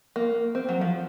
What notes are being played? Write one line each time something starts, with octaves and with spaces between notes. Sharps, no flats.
A#3
C4
F#3
F3